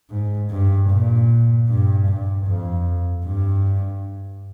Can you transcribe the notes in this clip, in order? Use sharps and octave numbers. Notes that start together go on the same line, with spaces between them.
G#2
G2
A#2
G2
G2
F2
G2